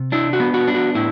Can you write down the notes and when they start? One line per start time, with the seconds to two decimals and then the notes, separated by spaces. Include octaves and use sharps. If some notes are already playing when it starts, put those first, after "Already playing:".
Already playing: C3
0.12 D4 E4
0.33 F#4
0.40 B3
0.54 F#4
0.67 D4
0.75 F#4
0.95 A2 E4